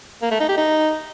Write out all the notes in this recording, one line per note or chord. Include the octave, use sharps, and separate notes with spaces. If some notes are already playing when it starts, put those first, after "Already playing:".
A#3
A3
D#4
G4
D#4